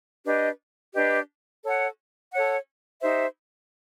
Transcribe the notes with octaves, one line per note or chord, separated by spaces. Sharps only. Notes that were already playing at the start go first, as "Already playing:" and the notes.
D4 G4 B4 D#5
D4 G4 B4 D#5
A4 C#5 F#5
A4 C#5 F#5
D#4 G4 C5 E5